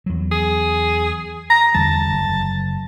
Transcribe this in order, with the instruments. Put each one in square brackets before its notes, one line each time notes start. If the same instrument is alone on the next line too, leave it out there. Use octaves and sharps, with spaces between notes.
[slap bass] E2 F#3
[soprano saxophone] G#4
A#5
[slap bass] E2 D3 G3 [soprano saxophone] A5
[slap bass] F#1